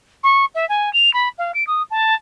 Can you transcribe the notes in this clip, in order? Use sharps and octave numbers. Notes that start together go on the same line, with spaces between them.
C#6
E5
G#5
F7
B5
F5
D7
D#6
A5